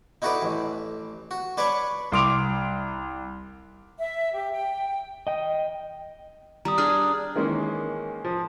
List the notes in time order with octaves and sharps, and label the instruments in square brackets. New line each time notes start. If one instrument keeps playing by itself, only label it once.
[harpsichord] D#4 E4 F#4 A4 B4 D5
A1
F#4
D4 B4 C#5 D5 B5 C#6
[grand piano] C2 C6 D6 D7 F7
[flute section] E5
G4
G5
[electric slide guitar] D#5 G5
[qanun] G3 [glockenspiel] A#5 D#6
[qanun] D4 G#4 [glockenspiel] F6
[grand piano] D#3 E3 G#3 A#3 C#4
F3